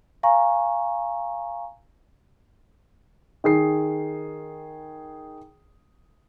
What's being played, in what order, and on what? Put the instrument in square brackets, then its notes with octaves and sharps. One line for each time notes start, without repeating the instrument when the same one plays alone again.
[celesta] F5 G#5 A#5 C#6
[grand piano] D#3 G#4 C7